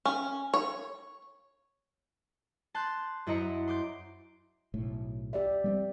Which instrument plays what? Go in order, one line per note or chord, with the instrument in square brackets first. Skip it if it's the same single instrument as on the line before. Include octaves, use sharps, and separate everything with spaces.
[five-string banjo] C#4
C#5
[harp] A5 C6 F#6 G6
F#2 E4 C5 D#5 A#5 C#7
C6 D6 G6
[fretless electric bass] B1 A2
[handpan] G4 D5 E5
[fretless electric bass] G3 A3 C4